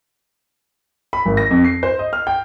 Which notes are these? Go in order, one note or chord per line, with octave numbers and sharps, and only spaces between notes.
B5
G#1
A#6
F2
C7
C5
D#5
F6
G5